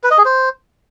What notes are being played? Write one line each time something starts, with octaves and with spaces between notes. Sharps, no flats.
B4
D#5
G#4
C5